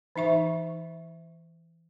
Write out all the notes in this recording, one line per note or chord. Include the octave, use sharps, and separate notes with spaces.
E3 D#4 E5 C#6